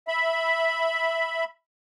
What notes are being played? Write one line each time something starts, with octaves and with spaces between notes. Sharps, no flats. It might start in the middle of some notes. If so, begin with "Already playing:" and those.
E5 B5